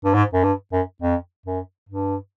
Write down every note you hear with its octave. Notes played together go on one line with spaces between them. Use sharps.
G2
G#2
F#2
G2
F#2
F2
F#2
G2